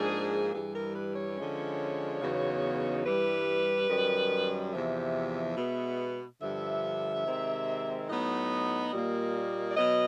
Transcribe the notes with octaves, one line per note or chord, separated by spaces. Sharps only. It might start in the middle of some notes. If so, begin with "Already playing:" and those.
Already playing: G#2 F3 A#3 D4 G#4
G2 E3 G3 G#4
A#4
B4
C#5
D3 F3 G#3 C#4
E2 C#3 F#3 B3 D#4
G2 E3 G3 B4
F#2 D#3 G3
E2 C3 F3 E5
B2 G#3 B3
G2 D3 F3 E5
C3 D#3 G#3 C4
A2 F#3 B3 D#4 D#5
A#2 G3 A#3
D5
B2 F#3 B3 D#5